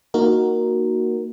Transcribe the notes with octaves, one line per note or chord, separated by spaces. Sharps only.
A#3 D#4 F#4 A#4